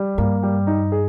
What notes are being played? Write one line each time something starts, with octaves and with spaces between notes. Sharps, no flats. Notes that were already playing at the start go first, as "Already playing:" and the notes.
Already playing: G3
G2 A#3
G3
D#4
G#4